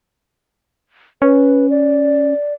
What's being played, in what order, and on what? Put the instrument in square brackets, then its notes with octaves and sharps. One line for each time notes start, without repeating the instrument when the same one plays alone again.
[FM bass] C#4 [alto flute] B4
[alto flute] D5